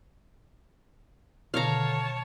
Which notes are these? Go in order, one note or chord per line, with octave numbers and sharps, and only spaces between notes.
B2 D3 D#3 C#5 F5 A5 A#5